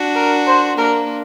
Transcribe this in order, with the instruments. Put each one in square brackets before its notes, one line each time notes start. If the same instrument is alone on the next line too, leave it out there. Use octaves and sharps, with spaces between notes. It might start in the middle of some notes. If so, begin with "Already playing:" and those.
Already playing: [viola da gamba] D4 F#4
[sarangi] A#4
C5
[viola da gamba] A#3 D4 [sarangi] A#4